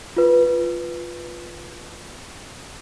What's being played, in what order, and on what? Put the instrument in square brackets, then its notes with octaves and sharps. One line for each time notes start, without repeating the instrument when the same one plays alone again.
[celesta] F4 B4